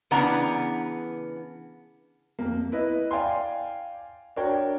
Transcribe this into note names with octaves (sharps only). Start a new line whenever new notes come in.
C#3 E3 B3 D4 F#5 A#5
F2 A#3
E4 B4 D#5
D5 F5 G5 G#5 C6
D4 F#4 A#4 C#5 G5